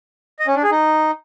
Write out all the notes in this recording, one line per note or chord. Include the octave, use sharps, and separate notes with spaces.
D#5
C#4
D4
G#4
D#4